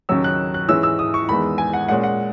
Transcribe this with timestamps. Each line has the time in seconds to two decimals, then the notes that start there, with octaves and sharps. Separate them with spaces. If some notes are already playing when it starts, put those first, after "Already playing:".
0.09 D#2 C#3 F#3 C#4 E6
0.24 F#6
0.54 F#6
0.68 G#2 E3 G#3 C#4 E6
0.83 E6
0.99 D#6
1.14 C#6
1.29 E2 D#3 G#3 B3 B5
1.58 G#5
1.73 F#5
1.88 A#2 G#3 C#4 F#5
2.04 F#5